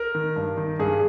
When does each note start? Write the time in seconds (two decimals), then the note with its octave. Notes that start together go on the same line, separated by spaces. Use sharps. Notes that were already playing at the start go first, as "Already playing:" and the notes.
Already playing: A#4
0.15 D#3
0.36 G2
0.57 D#3
0.79 G2 G#4